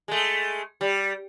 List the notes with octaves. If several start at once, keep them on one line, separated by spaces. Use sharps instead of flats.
G#3 A3
G3